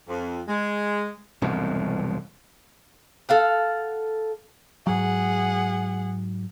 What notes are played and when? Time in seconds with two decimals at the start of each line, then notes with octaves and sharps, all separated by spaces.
0.08 F2
0.47 G#3
1.42 E1 C2 F2 G#2
3.29 A4 F5 F#5
4.87 G#2 F#3 G#4 F#5